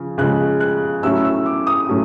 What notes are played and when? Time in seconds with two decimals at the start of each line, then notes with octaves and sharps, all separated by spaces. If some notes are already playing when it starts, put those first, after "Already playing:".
Already playing: C#3 F3
0.18 C#3 F3 G#3 F#6
0.60 F#6
1.03 A2 F#3 A3 C#4 E4 E6
1.25 E6
1.46 D6
1.67 D#6
1.88 A2 F#3 A3 C#4